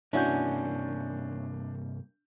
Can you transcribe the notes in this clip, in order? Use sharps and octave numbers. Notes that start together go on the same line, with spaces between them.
G2 C3 A#3 C#4 D4 E4 F#4 G6